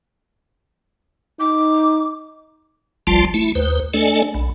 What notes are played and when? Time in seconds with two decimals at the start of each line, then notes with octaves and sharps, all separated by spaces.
1.40 D#4 D6
3.07 G1 C2 F3 G3 F4 A5
3.34 A3 E4
3.55 D#2 B4 C5
3.94 A3 D4 A4 D5 D#5 G#5
4.34 B1